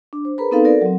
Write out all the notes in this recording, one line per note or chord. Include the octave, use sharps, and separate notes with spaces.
D4
C5
G#4 A#4 B4 A#5 B5
B3 C4 D#4 A4 B4 F5
F#4 A4 A#4 D5
F#3 C4